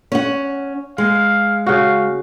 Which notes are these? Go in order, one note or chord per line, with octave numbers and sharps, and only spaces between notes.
C#4 F#5
G#3 F5
C#3 F#4 F5